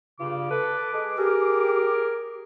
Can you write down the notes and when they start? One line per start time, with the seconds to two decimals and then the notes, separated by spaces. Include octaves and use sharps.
0.20 G2 C#3 F4 D6
0.50 A4 B4
0.94 G#3 G#4
1.18 G4 G#4 A#4